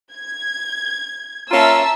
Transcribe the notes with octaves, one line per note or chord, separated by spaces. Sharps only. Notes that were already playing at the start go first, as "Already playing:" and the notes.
G#6
A#3 C#4 F4 E5 A5 A#5 E6